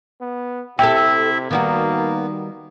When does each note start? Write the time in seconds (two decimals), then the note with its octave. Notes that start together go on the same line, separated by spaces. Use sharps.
0.21 B3
0.79 C3 E4 G4 A4 E5 G5
1.51 D#3 G3 A#3 B3 F#4